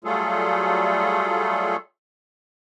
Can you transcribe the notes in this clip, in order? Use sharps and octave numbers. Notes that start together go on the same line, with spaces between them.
F#3 G3 A3 F4 G#4 A4